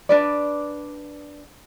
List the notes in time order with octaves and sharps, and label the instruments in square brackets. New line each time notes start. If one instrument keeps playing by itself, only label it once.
[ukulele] D4 B4 D5